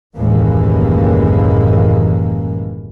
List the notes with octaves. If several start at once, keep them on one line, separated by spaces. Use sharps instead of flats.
F#1 D#2 A2 E3 G#3 A#3